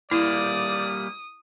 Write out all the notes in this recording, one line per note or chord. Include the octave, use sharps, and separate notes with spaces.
G3 A#3 E4 D5 D#6